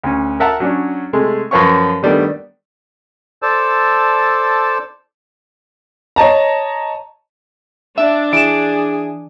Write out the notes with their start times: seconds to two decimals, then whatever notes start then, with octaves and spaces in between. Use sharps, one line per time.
0.03 D2 C#4
0.40 A#4 E5 F#5 A5 A#5
0.60 F#3 C#4 D4
1.13 C3 G#3 A3
1.51 F#2 F3 B4 C#5 F5 C#6
2.03 D#3 G3 A3 B3 D4
3.42 A4 C5 D5 A5 E6
6.16 C#5 D#5 A5 A#5
7.98 D4 E5
8.33 E3 G#4 D7 E7